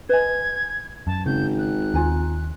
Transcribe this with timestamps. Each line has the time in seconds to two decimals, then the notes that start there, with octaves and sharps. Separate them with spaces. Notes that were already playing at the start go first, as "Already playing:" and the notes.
0.09 B4 D#5 G#5 G#6
1.07 F#2 A5
1.26 G#1 C#3 G6
1.58 F#6
1.94 D#2 F4 G#5 A#5